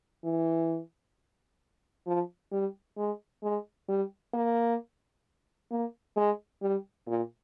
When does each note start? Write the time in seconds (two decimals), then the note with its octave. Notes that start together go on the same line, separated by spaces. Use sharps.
0.25 E3
2.07 F3
2.52 G3
2.97 G#3
3.43 G#3
3.88 G3
4.34 A#3
5.71 A#3
6.17 G#3
6.62 G3
7.07 A#2